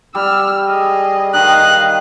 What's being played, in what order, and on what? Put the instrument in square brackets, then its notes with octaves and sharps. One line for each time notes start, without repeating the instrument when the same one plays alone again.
[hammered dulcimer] G3 [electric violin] E6 F6
[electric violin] G#4 D#5
[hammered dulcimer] D#3 [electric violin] D#5 F5 [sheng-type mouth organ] F#6